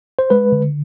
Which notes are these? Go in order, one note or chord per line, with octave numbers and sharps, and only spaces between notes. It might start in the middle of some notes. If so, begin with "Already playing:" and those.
C5
G#3 B4
D3